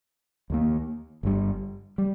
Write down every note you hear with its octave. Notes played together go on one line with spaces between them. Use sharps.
D#2 D#3 A#3
G1 G2 G3
G3